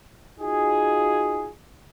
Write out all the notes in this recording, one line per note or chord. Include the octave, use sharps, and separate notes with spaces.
D#4 F4 F#4 G#4